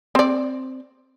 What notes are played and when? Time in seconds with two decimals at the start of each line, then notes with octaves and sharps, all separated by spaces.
0.15 C4 D5